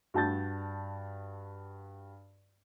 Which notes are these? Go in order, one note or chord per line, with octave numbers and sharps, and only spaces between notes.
G2 F#4 A5 G6 A6